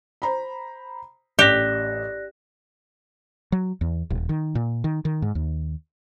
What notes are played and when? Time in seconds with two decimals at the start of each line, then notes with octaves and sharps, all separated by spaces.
0.22 C5 A#5 B5
1.39 A1 G4 D5 F#6 A#6 E7
3.52 F#3
3.81 E2
4.10 D#1
4.29 D#3
4.55 A#2
4.84 D#3
5.05 D#3
5.22 G#2
5.35 D#2